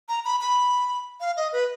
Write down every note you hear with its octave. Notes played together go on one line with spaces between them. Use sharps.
A#5
B5
B5
F5
D#5
B4